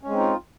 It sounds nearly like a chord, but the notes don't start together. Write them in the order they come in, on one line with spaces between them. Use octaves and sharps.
C#4 G#3 C4 D#4 F4